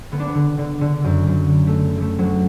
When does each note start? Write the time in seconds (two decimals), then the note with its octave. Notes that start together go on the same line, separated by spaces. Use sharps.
0.12 D3 B3
0.20 D4
0.28 B3
0.35 D3
0.58 D3
0.81 D3
1.04 F#2
1.27 F#2
1.50 D3
1.67 A3
1.73 D3
1.96 D3
2.01 A3
2.18 D2 F#3